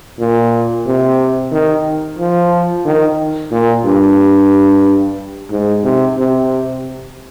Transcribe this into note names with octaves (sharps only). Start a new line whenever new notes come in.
A#2
C3
D#3
F3
D#3
A#2
G2
G#2
C3
C3